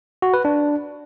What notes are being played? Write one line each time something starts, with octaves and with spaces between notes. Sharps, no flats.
F#4
B4
D4